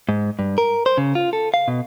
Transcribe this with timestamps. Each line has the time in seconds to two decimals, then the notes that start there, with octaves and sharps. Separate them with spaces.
0.09 G#2
0.39 G2
0.58 A#4
0.86 C5
0.98 C#3
1.15 F4
1.33 A4
1.54 F5
1.68 B2